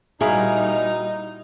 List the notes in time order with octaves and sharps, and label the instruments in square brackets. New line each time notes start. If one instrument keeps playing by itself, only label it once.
[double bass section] A#2 G3 [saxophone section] D#4 [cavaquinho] E4 A#4 F5 [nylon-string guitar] F#4 G#4